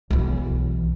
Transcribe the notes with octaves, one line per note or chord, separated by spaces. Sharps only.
B1 E3